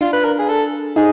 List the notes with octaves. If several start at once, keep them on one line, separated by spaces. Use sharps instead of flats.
D4 F4
B4
A#4
G#4
A4
D#4 G#4